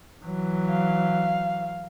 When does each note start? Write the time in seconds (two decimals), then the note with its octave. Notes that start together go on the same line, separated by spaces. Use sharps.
0.24 E3 F#3
0.70 F5